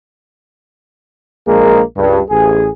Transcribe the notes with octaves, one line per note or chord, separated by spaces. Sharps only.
A#1 G#3 A#3 G#4 A#4
C#2 G2
A1 G#4